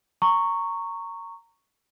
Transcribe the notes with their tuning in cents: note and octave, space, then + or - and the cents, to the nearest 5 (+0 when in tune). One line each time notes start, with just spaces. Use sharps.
A#5 -20 C#6 +0